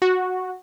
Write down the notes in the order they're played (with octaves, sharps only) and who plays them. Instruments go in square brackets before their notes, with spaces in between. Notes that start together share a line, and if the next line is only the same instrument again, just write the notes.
[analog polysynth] F#4